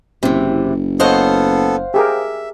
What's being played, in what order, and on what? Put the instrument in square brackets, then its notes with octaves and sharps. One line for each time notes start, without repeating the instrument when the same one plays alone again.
[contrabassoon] F#1 [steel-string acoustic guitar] C3 E3
[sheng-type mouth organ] B3 A4 [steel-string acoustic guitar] C5 F5 F#5 [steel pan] C#5 D#5
[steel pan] G4 G#4 A#4 [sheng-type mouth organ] E5